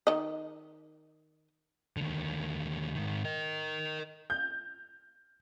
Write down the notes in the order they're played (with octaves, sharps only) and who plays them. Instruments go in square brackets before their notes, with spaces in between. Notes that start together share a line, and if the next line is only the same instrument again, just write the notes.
[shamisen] D#3 D#5
[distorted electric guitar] D#2 D3
G#2 D#3
A#4 D#5
[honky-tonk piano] G6